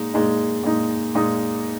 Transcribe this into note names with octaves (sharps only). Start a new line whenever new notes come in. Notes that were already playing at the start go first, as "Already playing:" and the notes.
Already playing: A#2 G#3 D#4
A#2 G#3 D#4
A#2 G#3 D#4
A#2 G#3 D#4